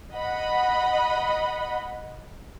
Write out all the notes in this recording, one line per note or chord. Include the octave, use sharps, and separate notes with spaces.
D#5 F#5 B5